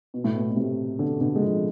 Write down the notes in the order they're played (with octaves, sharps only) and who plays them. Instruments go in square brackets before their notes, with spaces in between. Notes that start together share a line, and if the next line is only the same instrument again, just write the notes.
[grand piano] B2
A2
B2
B2
A2 C3
B2 D3
B2 D3
G#3
D3 F3